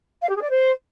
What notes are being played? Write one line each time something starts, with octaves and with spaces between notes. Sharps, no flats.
F5
G4
G#4
D5
C5